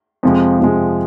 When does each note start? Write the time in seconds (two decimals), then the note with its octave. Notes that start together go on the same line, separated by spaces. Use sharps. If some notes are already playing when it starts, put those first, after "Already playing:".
0.23 F2 C3 F3 G#3
0.60 F2 C3 F3 G#3